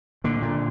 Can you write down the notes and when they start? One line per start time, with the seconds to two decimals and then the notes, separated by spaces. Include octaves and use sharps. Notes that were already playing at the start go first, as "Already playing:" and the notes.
0.24 A#2 D3
0.42 A#2